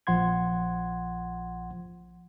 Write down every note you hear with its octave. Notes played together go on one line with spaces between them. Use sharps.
A#1 F3 F#5 C6 G#6